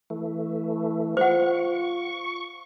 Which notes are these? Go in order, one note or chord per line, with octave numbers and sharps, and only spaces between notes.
E3 A3
F4 C5 F#5 C#6